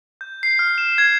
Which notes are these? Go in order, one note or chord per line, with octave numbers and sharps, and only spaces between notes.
G6
C7
F6
E7
G#6